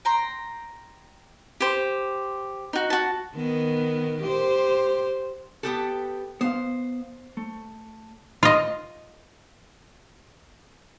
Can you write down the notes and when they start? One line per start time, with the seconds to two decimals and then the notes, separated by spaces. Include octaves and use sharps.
0.05 G5 A#5 C6
1.60 G4 C5
2.73 D#4 F#4
2.90 F#4 A5
3.36 D#3 B3
4.23 G4 C5
5.63 B3 G4 A4
6.41 B3 C5 F5
7.37 A3
8.43 F4 D#5